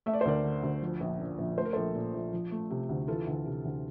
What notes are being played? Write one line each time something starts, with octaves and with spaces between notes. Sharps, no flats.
A3 E5
D5
C5
D2 A#4 D5
D3
D2
F3
A#1
A#2
A#1
A3 C5
A#4
A#1 A4 C5
A#2
A#1
F3
A3
C3
D2
E3 F4 A4
D2
C3
D2